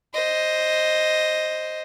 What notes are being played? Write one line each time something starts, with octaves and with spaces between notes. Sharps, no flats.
C5 D#5